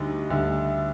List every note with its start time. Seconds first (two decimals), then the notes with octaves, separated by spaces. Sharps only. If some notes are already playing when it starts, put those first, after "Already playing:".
Already playing: D2 D3 G3 D#4
0.30 D2 D3 G3